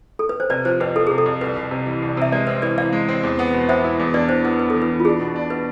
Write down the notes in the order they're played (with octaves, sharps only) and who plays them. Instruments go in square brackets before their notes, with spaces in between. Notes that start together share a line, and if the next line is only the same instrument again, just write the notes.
[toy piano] A4
B4
C5
[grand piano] C3 [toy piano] B4 D5
[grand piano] F3 [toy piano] C5
[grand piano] F2 [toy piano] B4
[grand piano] F3 [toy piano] A4
[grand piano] C3 [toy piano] G#4
[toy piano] A4
[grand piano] F2
[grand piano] C2 [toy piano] B4
[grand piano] C2
C3
E3
C2
[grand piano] C3 [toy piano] E5
[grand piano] G#3 [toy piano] B4 D5
[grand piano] C4 [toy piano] B4
[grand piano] E3 [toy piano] B4 D5
[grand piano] E3 [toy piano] D5 F5
[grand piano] G#3
C4
E2
B3
B2
[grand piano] B3 [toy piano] C5 E5
[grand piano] E4
E2
[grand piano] D4 [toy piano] B4 D5
[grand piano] E3 [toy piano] C5
[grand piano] B3 [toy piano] B4
[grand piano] B3 [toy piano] B4
[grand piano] E3 [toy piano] A4
[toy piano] B4
[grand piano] E3
[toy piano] F4
[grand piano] D4 [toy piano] G#4
[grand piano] B2
D4
[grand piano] B2 [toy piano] B4